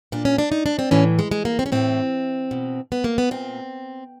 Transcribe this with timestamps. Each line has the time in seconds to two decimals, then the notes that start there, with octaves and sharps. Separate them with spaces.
0.12 A#2 D4
0.25 C#4
0.38 D4
0.52 D#4
0.66 D4
0.79 C4
0.91 A2 E3 C#4
1.19 G#3
1.31 G#3
1.45 A#3
1.59 C4
1.66 C#4
1.72 A2 E3 C4
2.51 B2
2.92 B3
3.04 A#3
3.18 B3
3.31 A#2 C4